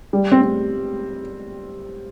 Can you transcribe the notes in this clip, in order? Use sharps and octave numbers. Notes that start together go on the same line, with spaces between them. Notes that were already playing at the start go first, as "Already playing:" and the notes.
G3
C4
C4